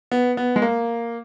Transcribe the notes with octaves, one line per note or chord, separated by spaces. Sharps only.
B3
B3
G#3
A#3